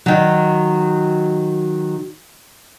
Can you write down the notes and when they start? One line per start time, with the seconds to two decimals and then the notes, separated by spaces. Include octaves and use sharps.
0.06 D#3 F#3